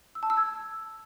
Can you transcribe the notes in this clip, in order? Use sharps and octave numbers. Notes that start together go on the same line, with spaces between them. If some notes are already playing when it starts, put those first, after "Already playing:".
E6
A5
E6
G#6